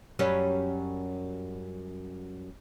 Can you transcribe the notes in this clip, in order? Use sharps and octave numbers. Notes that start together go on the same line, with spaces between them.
F#2 G3 C#4